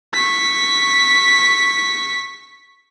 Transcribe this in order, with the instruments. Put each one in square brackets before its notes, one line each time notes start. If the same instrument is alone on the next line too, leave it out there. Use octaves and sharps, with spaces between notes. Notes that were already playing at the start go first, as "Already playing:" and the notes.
[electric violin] C#6 B6